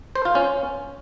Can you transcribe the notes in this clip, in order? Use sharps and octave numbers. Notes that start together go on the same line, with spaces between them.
C5
F4
C#4